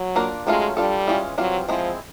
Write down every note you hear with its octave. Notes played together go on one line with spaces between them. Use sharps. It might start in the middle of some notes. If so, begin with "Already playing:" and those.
Already playing: F#3
A#3 D4 F4 A#4
D#3 F#3 G#3 A3 C#4 F4
G3 D4 F4 A4
E3 G#3 C#4 F4
E3 F#3 G3 C4 F4
F3 G#3 C4 E4